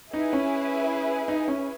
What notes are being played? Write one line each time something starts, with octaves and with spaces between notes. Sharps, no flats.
D#4 E4 G#4 B4
C#4
D#4
C#4